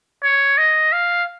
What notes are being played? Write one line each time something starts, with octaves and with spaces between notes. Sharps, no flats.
C#5
D#5
F5